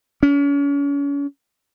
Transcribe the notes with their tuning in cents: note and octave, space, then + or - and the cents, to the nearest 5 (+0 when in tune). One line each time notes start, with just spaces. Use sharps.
C#4 +35